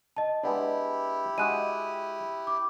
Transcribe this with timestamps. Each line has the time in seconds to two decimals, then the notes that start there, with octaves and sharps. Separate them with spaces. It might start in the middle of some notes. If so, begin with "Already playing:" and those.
0.16 D#5 A5
0.43 G#3 B3 D4 E4 G4
1.38 G#3 F#4 D#6 F#6 D#7
2.47 D6